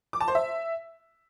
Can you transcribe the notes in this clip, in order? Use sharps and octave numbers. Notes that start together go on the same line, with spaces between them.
D6
A5
C5
E5